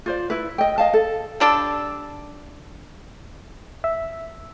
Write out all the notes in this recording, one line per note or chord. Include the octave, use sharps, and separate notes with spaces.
F4 C5 D5
E4 B4
D#5 G5
D#5 F5 A5
A4
G3 D4 A4
E5